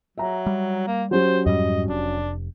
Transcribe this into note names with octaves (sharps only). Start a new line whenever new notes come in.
F#3 E5 A#5
G3
A#3
F#3 C#4 G4 C5
F2 G#2 G3 D#5
F1 D4